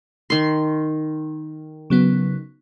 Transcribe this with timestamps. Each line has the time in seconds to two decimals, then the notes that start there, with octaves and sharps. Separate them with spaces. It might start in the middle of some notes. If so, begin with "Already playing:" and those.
0.30 D#3 C6
1.90 C#3 F#3 B3